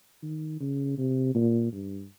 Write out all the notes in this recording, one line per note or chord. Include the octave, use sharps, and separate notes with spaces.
D#3
C#3
C3
A#2
G2